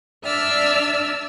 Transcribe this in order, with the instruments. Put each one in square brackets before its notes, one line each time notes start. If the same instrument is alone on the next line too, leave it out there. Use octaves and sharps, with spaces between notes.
[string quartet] D4 D5 E5 E6 F6